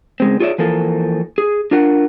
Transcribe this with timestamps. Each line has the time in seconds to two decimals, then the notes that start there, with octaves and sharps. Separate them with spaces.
0.20 C#3 G#3 C4
0.40 F4 G#4 C#5 D5 E5
0.58 E3 F3 A#3 A4
1.38 G#4
1.71 D4 F4 A#4 F#5